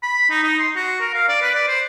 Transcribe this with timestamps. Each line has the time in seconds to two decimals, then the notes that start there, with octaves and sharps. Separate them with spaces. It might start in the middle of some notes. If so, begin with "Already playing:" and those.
0.03 B5
0.30 D#4
0.43 D#4
0.59 C6
0.76 F#4
1.01 A#4
1.14 F5
1.29 D5
1.42 B4
1.55 D5
1.68 C5